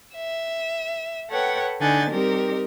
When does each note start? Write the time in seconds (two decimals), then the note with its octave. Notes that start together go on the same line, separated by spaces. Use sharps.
0.14 E5
1.29 A4 B4 C#5 F#5 G5
1.80 D3 D#4 F#5 G#5 G6 A6
2.10 G3 C4 D#4 G4 A#4